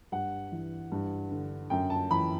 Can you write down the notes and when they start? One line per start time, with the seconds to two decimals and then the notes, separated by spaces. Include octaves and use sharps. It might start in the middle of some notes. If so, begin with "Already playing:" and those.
0.12 G2 F#5
0.52 E3
0.92 G2
1.31 D3
1.70 F#2 G5
1.90 A5
2.10 E3 B5